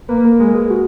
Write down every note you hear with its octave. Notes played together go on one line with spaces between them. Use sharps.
A#3 B4
A#4
G#3 A#4
G#4
F#4